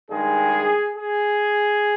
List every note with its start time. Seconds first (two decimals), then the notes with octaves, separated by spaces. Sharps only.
0.10 G2 D#3 G#3 G#4
0.96 G#4